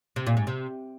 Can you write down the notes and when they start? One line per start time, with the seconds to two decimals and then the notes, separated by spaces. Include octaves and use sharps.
0.16 C3
0.26 A#2
0.37 G#2
0.47 C3